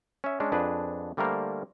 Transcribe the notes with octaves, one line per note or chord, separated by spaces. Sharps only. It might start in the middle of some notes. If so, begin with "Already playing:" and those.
C#4 E5
G#3 C#4 D4
F2 D4 G#4 B4
D3 G3 A3 A#3 A#4 C5